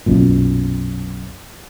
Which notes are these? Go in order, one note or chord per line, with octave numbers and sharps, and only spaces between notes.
B1 F#2 A#2